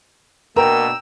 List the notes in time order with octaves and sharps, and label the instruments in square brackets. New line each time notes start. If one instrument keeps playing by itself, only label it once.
[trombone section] B2 A#3 D4 [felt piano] A#4 [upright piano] G5 A#5 [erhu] E6